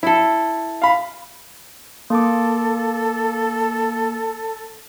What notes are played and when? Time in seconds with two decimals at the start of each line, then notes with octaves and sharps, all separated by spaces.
0.03 E4 A4
0.82 F5 B5
2.10 A#3 A4 D6